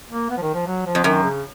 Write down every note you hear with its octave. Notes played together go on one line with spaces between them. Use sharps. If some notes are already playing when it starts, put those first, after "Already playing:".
A#3
B3
F3
D#3
F3
F#3
F3
F2
F#2 D#3
C#3